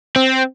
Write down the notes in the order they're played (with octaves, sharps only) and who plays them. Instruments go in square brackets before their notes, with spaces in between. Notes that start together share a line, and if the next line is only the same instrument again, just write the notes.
[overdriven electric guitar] C4